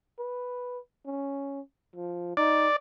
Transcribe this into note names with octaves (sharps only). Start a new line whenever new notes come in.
B4
C#4
F3
D#4 D5